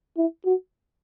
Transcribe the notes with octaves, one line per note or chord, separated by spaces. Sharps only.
E4
F#4